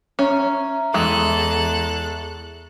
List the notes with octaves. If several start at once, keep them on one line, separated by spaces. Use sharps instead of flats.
C#4 E5 A#5 C#6
E2 E3 G#3 A4 F#6